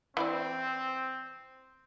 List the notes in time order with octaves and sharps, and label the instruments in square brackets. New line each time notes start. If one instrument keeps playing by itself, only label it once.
[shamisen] E3 E4 D5 [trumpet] C4